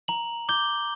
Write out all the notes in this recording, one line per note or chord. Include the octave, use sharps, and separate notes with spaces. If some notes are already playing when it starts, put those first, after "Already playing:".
A#5 F#7
D6 G6 G7